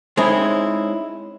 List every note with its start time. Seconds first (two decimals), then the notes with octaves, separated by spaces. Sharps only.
0.17 G#3 C4 C#4 D#4 E4